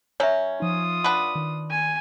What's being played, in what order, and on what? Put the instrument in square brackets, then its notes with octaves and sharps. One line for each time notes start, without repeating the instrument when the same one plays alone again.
[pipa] F#3 C#4 [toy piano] C#5 E5
[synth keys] F3 D#4 [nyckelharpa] F4 D#6
[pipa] D4 B4 [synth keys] F#5
[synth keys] D#3
[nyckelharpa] G#5